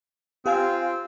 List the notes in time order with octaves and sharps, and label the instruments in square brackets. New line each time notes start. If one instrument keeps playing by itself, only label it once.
[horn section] C4 F4 [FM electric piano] G4 F5 G#5